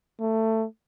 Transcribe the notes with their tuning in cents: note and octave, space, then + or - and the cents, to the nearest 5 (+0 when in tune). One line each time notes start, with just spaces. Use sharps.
A3 +15